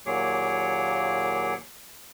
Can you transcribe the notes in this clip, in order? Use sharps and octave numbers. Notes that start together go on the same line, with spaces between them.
D#2 A#2 F#3 G#4 C#5 D6